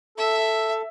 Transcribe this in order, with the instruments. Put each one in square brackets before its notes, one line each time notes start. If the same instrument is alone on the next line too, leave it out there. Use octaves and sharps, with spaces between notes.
[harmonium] A4 [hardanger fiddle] E5